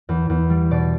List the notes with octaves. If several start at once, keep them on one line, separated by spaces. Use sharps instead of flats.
E2
E2
G3
B2 D5